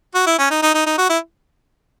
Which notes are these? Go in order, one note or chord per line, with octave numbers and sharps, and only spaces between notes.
F#4
E4
C#4
D#4
D#4
D#4
D#4
F#4
E4